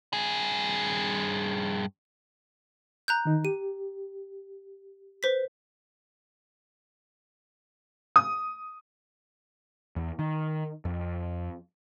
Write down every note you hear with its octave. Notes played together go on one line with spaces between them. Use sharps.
G2 G#4
A#5 F#6 G6
D#3 D#4
G4 D#7
B4 C5 B6
D#6
E2
D#3
F2